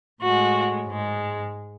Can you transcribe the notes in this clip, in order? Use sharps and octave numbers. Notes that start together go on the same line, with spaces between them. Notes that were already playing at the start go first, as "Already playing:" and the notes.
A2 G#3 F#4
G#2 G#3